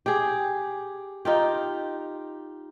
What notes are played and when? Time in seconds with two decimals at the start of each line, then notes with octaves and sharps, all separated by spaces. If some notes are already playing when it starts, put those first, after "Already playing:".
0.06 G4 G#4
1.25 D#4 F4 G4